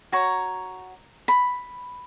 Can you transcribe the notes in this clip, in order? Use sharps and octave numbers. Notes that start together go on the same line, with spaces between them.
F#4 C#5 A#5
B5